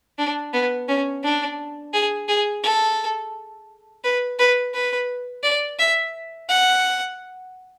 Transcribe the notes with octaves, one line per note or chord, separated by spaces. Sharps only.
D4
B3
C#4
D4
G#4
G#4
A4
B4
B4
B4
D5
E5
F#5